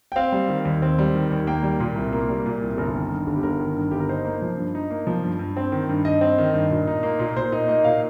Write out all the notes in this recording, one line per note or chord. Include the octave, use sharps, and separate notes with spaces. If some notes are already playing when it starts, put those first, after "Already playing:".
G5
C4 F5
G3
D#3
D#2
C4
G3
D#3
D#2
A#3 G5
G3
A#2
C2
A#3
G3
A#2
C2
G1 A#4
D#3
G2
G1
G4
G1 A#4
D#3
G2
G1 G4
A#4
D#4 C5
A#3
F3
G2
D#4
A#3
F3
G2
G2
C4
D#3
G2
G2 D#5
C4
D#3
G2
A#2
D#4
A#3
A#2
A#2 C5
D#4 D#5
A#3 D#5
A#2 F5